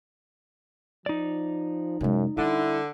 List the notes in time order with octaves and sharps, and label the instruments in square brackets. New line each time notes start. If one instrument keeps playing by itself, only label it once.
[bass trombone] F3 [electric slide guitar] D#4 D5
[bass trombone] F#2 [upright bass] C3 G#3
[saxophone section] D3 [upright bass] G3 [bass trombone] E4